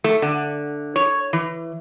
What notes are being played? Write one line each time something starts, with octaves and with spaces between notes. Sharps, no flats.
A3
D3
C#5
E3